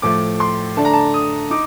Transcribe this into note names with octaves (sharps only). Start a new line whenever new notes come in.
A2 F3 A3 D6
C6
D3 A3 D4 A5
A#5
A5
D#6
D#4 D6